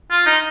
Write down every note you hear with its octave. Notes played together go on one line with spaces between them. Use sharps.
F4
D#4